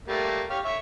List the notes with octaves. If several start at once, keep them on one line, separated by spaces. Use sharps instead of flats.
G3 A3 A#3
G4 C#5 F5
C#5 E5